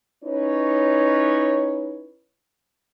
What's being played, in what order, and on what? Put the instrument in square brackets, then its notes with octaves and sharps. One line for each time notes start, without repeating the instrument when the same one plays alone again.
[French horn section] C#4 D#4 E4 B4 C#5